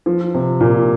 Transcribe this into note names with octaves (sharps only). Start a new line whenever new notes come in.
F3
C3
A#2